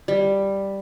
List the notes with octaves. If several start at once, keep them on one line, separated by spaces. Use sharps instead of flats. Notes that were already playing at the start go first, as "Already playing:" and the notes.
G3